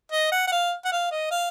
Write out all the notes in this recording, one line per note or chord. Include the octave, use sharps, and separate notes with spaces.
D#5
F#5
F#5
F5
F#5
F5
D#5
F5